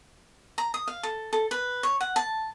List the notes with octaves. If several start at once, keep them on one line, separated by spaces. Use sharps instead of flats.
A#5
D#6
F5
A4
A4
B4
C#5
F#5
A5